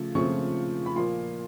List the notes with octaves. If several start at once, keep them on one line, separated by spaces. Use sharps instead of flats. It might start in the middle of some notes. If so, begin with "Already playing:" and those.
Already playing: C#3 F3 A3
C#3 F3 A3 C4 C#6
B5
A#2 F3 A#3 C6